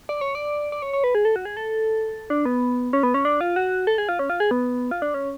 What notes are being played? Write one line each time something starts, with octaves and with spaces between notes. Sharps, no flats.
D5
C#5
D5
D5
C#5
C#5
B4
G#4
A4
F#4
G#4
A4
D4
B3
C#4
B3
C#4
D4
F4
F#4
A4
G#4
F4
C#4
F4
G#4
B3
F4
D4
C#4